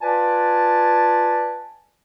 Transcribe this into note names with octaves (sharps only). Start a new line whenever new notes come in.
F4 B4 D5 G#5 A5